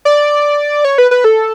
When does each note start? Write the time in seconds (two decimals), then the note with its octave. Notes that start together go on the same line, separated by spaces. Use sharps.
0.05 D5
0.85 C#5
0.98 B4
1.11 B4
1.24 A4